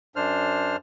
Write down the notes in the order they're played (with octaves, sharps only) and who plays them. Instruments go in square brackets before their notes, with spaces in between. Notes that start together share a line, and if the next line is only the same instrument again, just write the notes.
[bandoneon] F#2 D4 C5 F6